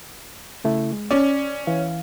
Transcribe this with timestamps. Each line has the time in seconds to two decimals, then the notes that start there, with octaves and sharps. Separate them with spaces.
0.64 C#3 A3 E4
0.92 G#3
1.11 C#4 D5
1.67 E3 F5